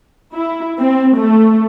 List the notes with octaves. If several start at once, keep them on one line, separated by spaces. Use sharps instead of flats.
E4
C4
A3